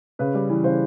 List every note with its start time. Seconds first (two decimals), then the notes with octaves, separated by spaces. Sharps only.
0.19 C#3 B4
0.34 G3
0.49 E3
0.64 C#3 C5